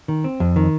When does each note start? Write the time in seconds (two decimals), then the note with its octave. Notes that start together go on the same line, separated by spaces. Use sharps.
0.08 D#3
0.24 C4
0.40 F2
0.56 D#3